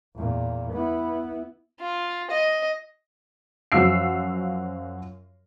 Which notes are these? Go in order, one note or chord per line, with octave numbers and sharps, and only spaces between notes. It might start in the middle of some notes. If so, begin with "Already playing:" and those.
E2 A#2
B3 E4
F4
D#5
F#2 F3 F#4 F5 E6 C7